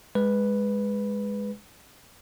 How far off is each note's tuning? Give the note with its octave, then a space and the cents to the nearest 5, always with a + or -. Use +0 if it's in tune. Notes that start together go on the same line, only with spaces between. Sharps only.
G#3 -10 B4 +0